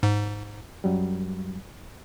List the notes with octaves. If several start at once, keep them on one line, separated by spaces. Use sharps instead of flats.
G#2
F#2 F#3 G3